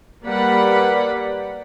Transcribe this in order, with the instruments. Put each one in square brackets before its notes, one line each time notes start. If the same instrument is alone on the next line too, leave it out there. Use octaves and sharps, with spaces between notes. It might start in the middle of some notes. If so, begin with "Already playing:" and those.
[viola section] G3 A#3 B4 D5 F#5 B5